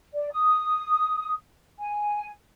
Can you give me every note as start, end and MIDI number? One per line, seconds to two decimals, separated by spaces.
0.13 0.28 74
0.31 1.32 87
1.78 2.30 80